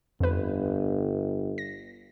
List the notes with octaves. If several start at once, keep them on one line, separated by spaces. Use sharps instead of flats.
G1 F2 B4
A#6